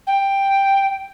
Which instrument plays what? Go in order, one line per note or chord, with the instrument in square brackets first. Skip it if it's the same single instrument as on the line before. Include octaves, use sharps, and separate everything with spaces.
[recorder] G5